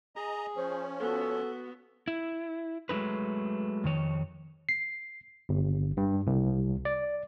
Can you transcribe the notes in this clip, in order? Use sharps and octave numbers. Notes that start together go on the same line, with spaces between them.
G#4 D#5 A#5
F3 C#4 C5
B3 F#4 A4
E4
F#3 G#3 A3 D#4 B4
F2 D#3 C#5
C7
G1
G2
C2
D5